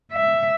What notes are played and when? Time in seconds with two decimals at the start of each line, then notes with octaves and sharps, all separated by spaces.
0.12 E5